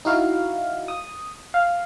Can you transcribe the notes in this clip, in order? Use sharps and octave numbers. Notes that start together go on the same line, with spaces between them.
D#4 E4 F#4 F5
D#6
F5